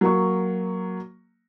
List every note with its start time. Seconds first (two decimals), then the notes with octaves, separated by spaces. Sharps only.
0.01 F#3 A#3 C#6